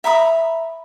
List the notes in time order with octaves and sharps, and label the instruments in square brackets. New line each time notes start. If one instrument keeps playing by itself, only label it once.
[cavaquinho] E5 A#5 B5 D#6